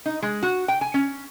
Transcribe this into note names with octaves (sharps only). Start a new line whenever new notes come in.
D#4
G#3
F#4
G5
G#5
C#4